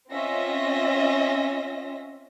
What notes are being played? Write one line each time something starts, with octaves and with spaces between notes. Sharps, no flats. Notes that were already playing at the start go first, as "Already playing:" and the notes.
C4 C#4 F4 D#5 E5 A#6